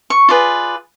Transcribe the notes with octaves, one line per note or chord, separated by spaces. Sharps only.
C#6
F4 G#4 B4 D5